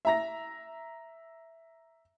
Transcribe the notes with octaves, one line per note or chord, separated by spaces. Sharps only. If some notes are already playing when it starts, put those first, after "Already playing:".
E5 A#5 A#6